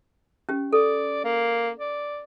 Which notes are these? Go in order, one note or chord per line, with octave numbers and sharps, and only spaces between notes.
C#4 G4
A4 D5
A#3
D5